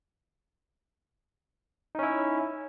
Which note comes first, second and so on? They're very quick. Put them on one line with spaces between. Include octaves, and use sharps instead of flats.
D#4 C#4 E4